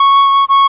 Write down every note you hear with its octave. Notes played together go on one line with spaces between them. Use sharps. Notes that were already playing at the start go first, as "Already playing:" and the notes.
Already playing: C#6
C#6